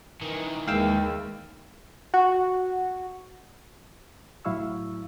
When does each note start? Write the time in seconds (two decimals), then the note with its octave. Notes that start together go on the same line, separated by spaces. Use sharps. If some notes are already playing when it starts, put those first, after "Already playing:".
0.22 D#3 E3
0.68 D#2 G#3 A#3 F5 G5 E6
2.14 F#4
4.45 A2 F#3 E4 F5 C#6 E6